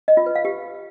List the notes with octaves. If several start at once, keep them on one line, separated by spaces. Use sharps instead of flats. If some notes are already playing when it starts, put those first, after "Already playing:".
D#5
F4
B4
F5
G4